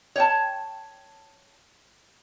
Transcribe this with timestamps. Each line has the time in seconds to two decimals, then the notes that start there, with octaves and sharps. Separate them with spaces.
0.16 C#5 G5 A5